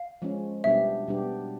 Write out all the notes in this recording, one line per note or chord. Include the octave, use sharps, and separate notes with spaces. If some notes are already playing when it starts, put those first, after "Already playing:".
Already playing: F5
F3 G#3 C#4
B2 G3 B3 D4 G4 E5
B2 G3 B3 D4 G4